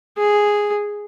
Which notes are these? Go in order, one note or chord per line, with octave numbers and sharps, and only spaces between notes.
G#4